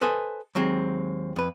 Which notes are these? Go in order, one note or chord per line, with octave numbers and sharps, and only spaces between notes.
A4 B4 C5 D#5 G#5
D#2 F#3 G#3 C4
F2 B4